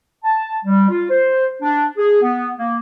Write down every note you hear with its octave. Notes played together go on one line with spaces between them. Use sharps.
A5
G3
F4
C5
D4
G#4
B3
A#3